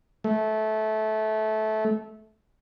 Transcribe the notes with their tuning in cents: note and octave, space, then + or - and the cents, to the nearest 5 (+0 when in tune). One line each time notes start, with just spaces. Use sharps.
A3 -20